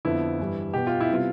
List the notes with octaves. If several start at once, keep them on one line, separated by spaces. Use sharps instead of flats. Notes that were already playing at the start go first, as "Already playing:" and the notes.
F2 D3 F3 B3 E4
G2 E3 G3
B2 B3 G4
F4
E4
C3 G3 B3 F4